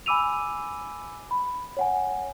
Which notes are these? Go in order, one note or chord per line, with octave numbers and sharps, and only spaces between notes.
G#5 B5 D6 E6 D#7 F7
B5
C#5 F#5 G#5